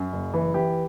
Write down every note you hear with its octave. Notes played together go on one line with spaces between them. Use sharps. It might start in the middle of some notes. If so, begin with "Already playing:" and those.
Already playing: F#2
F#1
E3
E3 G4